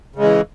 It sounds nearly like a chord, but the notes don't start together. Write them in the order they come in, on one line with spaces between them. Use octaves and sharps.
C#3 G#3 E3